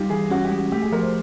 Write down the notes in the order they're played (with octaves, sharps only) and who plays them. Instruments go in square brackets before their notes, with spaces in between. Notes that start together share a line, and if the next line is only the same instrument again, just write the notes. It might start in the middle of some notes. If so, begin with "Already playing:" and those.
Already playing: [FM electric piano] G3 D#4 [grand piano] F4 G4
[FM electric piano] E3 [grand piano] G#4
[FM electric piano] C#4 [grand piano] F#4
[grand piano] G4
[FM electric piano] G#3
[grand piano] F#4
[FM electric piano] A3 [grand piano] G4
[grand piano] G#4
[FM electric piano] F3 [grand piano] A#4
[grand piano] C5